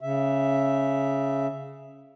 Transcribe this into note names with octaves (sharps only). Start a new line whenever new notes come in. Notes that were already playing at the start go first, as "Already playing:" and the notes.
C#3 E5